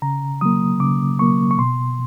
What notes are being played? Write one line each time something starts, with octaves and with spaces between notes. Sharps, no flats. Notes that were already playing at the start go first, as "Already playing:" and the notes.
C#3 A#5
F#3 A#3 D#6
C#3 D6
F#3 A#3 C#6
C#6
B2 C6